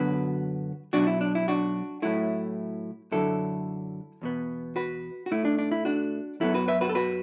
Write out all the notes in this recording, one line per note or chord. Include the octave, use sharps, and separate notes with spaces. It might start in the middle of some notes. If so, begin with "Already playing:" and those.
Already playing: F#2 D3 F#3 B3 F#4 B4
B1 B2 F#3 D4 F#4
E4
D4
E4
D4 F#4
A2 F#3 A3 E4
F#2 D3 F#3 E4 A4
E2 B2 B3
F#4 B4
F#4
A2 A3 E4
D4
D4
E4
D4 F#4
F#2 F#3 B3 E4 A4
F#4 B4
B4 E5
F#4 B4
A4
F#4 B4